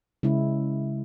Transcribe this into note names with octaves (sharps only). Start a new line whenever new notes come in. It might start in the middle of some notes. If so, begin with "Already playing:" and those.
C#3 G#3 E4